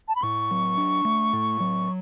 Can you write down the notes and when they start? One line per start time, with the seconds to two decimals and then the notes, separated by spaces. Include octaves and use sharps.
0.08 A5
0.16 B5
0.23 A2 C#6
0.51 F#3
0.77 D4
1.05 A3
1.33 A2
1.60 F#3